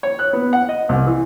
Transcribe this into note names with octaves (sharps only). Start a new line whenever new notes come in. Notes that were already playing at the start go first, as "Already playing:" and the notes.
C#5
F#6
B3
F#5
D#5
C2
E3